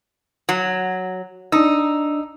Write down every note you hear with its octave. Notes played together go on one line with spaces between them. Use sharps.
F#3
D4 D#4 E6